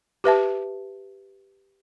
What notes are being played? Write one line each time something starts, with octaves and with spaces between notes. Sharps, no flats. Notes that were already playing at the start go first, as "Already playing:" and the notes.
G4 B4 E5 A5